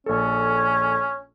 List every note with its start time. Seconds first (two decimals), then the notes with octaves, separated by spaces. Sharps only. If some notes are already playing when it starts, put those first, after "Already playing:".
0.06 A#1 C#4 A4